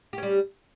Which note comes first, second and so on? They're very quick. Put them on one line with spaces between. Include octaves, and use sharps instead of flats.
G4 C#4 G3